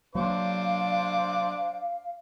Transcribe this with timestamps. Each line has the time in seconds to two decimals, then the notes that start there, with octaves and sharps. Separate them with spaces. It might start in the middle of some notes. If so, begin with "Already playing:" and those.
0.15 F#3 A#3 D4 C5 F5 D6